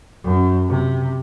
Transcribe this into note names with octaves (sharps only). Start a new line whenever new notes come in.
F#2
C3